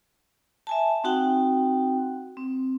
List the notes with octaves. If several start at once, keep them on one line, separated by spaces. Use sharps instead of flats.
E5 G#5 A5
C4 D#4 F#4 F#5 G5
C4